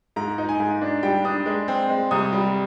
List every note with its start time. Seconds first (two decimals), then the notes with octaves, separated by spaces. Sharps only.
0.16 G#2 A#5
0.38 D#4
0.49 G#5
0.60 G#2
0.81 D4
1.03 G3 G5
1.25 D4 D#6
1.46 G#3
1.68 C4
1.89 G#3
2.11 C2 D#6
2.32 G3